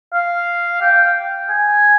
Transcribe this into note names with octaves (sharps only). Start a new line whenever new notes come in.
F5
G5
G#5